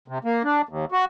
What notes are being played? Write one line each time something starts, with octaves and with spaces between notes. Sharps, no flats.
C3
A#3
D4
D#2
F#4